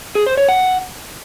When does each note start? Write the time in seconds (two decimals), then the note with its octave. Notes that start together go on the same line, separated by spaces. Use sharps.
0.15 G#4
0.26 C5
0.37 C#5
0.49 F#5